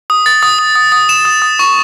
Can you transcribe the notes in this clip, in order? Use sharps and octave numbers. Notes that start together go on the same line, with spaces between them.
D#6
A6
D#6
D#6
D#6
D#6
E7
D#6
D#6
C#6